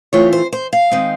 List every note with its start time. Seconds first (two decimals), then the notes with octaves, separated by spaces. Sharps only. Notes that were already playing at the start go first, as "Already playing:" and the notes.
0.13 E3 A3 C4 F4 C#5
0.33 C5
0.53 C5
0.73 F5
0.91 D#3 G#3 C4 D#4